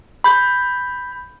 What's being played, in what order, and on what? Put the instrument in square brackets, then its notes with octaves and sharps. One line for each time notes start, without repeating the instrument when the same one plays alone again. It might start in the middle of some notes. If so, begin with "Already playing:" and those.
[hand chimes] B5 G6